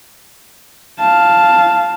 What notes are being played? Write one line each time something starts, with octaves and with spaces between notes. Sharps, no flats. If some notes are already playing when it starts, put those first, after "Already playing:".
F5 A5